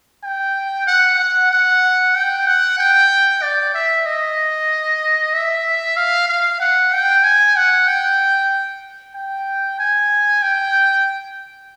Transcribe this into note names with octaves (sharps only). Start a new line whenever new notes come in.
G5
F#5
F#5
F#5
G5
F#5
G5
D5
E5
D#5
E5
F5
F5
F#5
G5
G#5
F#5
G5
G5
G#5
G5